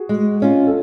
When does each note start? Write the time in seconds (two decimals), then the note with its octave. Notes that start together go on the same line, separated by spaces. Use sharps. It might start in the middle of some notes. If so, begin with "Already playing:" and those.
Already playing: F#4 G#4
0.09 G#3
0.42 C#4 F4
0.67 A4